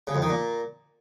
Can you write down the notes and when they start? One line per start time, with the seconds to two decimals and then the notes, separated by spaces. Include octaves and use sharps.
0.07 C#3
0.15 F2
0.22 D#3
0.29 A#2